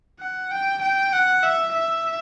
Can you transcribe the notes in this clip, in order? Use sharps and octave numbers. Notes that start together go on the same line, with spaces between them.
F#5
G5
G5
F#5
E5
E5